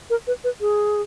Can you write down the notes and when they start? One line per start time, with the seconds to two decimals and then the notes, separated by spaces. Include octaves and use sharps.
0.10 A#4
0.27 B4
0.44 B4
0.61 G#4